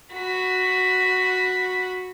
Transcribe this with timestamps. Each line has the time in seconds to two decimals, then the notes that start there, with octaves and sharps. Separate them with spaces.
0.14 F#4 B5